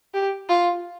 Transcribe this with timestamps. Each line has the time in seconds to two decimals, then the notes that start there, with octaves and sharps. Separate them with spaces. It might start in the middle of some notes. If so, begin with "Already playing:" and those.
0.14 G4
0.49 F4